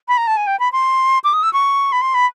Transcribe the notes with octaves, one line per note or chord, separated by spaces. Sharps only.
B5
A#5
A5
G#5
G5
B5
C6
D6
D#6
E6
C#6
B5
C6
B5